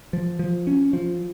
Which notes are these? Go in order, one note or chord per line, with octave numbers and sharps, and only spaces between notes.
F3
F3
C#4
F3